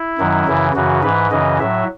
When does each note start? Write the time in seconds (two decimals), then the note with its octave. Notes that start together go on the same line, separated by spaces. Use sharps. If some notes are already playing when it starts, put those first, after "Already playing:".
Already playing: E4
0.18 F#2 D#3 F#3
0.47 F#2 C#3 E3
0.75 F#2 C#3 E3 F#4
1.03 G#2 E3 B4
1.31 F#2 C#3 E3 D#5
1.59 A2 F#3 E5